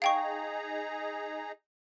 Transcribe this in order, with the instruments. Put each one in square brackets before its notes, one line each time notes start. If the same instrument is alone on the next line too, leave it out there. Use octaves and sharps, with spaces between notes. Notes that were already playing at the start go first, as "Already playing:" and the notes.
[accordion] D#4 G#4 A#5 [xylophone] F5 G5 C#6